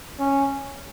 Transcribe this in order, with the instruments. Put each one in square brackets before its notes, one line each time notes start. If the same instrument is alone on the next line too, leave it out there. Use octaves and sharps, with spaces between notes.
[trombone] C#4